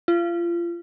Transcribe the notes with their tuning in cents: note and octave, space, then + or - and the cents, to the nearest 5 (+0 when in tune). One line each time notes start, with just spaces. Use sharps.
F4 -30